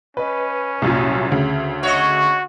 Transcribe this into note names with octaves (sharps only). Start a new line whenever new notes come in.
C#4 B4 D#5
C2 F#2 A#2
D2 C#3
F#4 C#5 D#5